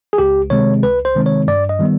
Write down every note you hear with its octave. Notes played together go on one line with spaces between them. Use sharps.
G#4
C#2 G4
C3 D#3 G#3 C4 C#5
C#2 B4
C5
C3 D#3 G#3 C4
C#5
G2 D5
D#5
D#3 G3 B3